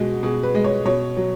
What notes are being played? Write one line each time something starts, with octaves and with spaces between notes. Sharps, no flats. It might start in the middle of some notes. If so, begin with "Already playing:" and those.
Already playing: B2 G#3 F#4
B2 G#4
B4
G#3
C#5
B2 C#5
F#3